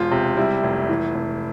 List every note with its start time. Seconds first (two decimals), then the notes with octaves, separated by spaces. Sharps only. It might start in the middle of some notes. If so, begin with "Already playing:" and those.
Already playing: E1 F4
0.11 C3
0.37 G3 E4
0.63 F1
0.89 E3
1.15 F1